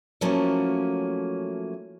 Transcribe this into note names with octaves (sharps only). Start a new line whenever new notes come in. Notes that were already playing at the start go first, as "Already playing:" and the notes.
F3 F#3 A3 A#3 C#4 E4